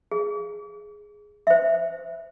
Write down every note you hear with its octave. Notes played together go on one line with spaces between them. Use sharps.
G#4
C5 E5